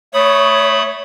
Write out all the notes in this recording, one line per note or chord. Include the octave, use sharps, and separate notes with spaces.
A3 C#5 B5 D#6